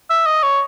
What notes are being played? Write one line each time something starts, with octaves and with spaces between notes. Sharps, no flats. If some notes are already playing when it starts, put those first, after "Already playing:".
E5
D#5
C#5